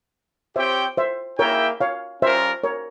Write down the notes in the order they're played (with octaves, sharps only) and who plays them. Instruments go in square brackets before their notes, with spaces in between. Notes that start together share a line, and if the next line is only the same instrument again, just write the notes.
[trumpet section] C4 G4 C#5 G5 [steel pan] C5 E5
[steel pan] C5 E5
[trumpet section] A#3 E4 G#4 E5 G5 [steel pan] A#4 C#5
[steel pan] C#5 F5
[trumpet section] G3 C#4 F4 A#4 [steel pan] C5 E5
[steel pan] A#4 C#5